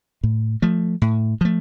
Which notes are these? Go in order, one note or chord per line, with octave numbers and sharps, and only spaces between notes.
A2
F3 A3
A2
F3 A3